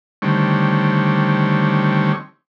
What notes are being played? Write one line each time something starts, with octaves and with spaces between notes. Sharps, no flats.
D3 D#3 G3 A3 C4 C#5